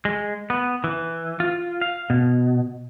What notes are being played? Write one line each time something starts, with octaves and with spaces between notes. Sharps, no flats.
G#3
B3
E3
F4
F5
B2